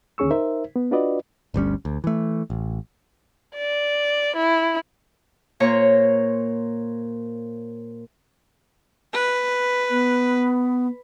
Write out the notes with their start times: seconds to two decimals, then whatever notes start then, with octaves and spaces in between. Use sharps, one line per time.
0.18 D#2 D3 C#4 G#4 C#6 E6
0.31 D#4 A#4 C5 E5
0.76 B3
0.91 D4 F4 F#4 B4 D5 D#5
1.54 G1 D2 G3 C#4
1.85 D2
2.04 E3 A3
2.50 A1
3.56 D5
4.36 E4
5.60 A#2 C5 C#5 A#5 C#6
9.13 B4
9.90 B3